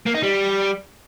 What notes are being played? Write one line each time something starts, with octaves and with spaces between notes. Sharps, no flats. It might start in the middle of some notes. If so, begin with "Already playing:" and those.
A#3
D#4
G3